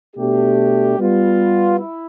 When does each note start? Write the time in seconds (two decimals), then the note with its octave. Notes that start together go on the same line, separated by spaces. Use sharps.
0.15 B2 A3 D4 G4
0.97 G3 B3 F4
1.78 E4